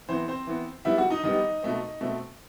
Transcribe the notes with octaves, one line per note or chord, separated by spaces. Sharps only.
E3 B3 C4 C5
C4 C5
E3 B3
D#3 G3 B3 E4 E5
F#4 F#5
D#4 D#5
D#3 G3 B3 D#4 D#5
B2 A3 C4
B2 A3 C4